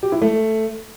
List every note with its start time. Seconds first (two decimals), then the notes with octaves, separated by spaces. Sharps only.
0.03 G4
0.12 E4
0.22 A3